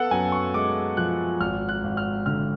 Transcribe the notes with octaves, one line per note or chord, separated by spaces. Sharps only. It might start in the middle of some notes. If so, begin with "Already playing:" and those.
Already playing: B3 A4 F#5
F#2 G#5
C#6
G#3 D6
F3 F#6
G#1 F6
F#6
G#1
F6
D3 F6